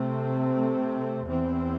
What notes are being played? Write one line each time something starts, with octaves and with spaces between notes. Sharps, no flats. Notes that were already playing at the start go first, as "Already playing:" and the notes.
Already playing: C3 A3 C4
E2 E3 C4